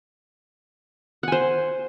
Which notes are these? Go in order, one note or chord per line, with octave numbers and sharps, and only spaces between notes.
C5 F#5 G#5